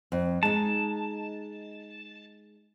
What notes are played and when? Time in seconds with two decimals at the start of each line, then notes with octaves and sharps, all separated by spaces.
0.12 F2
0.43 G#3 D#4 A5